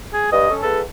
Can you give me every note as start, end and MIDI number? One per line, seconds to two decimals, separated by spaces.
0.13 0.31 68
0.32 0.47 43
0.32 0.52 75
0.50 0.60 61
0.50 0.60 69
0.62 0.80 40
0.62 0.80 69
0.62 0.80 71